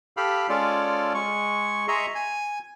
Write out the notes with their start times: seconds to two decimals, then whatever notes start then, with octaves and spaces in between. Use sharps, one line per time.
0.17 G4 A4 F5 B5
0.49 G#3 C#4 F4 A4 D5
1.14 G#3 C#6
1.88 G#4 D#5 E5 A#5 C6 C#6
2.15 G#5